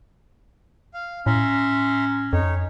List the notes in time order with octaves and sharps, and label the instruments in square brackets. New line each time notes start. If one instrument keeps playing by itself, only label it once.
[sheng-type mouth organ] F5
[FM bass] A2 [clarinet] C#4 [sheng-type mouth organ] E5 A#5 C6
[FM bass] F2 [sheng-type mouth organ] D#4 C#5